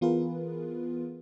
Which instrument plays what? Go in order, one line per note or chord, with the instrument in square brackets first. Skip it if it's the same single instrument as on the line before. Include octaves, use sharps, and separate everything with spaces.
[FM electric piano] E3 B3 F4 G#4 A#4 B4